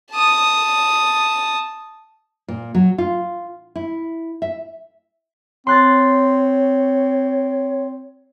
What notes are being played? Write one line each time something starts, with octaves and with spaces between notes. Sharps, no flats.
A5 D#6
A#2
F#3
F4
E4
E5
C4 C#5 C6 F#6 A6